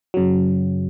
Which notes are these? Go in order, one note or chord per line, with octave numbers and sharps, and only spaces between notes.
F#2 C#3 F#3